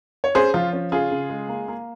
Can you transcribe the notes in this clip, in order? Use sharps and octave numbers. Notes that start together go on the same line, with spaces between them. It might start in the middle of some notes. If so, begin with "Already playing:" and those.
C#5
C#4 G#4 C5
F3 F4
C#4
C#3 F4 G#4
C#3
G#3
A#3
A#3